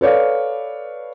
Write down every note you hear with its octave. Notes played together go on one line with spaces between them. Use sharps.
A4 B4 C#5 D5 F5